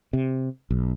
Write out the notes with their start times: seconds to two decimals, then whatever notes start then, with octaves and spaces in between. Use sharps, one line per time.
0.13 C3
0.71 B1